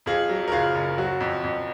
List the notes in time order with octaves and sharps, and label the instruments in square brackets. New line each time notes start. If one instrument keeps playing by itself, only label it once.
[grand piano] F2 F4 G#4
F#3
A#4
F#1 F4 G#4
F#1
F#3 F#4
F2
F2